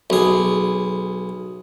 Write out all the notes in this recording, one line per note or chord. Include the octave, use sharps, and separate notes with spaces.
B1 G#4